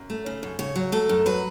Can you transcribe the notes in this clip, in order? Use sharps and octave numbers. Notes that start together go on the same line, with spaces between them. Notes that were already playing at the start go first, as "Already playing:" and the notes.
Already playing: F#2
A3
C#3
F#2
C#3 C#5
F#3
A3 A4
F#2
F#3 B4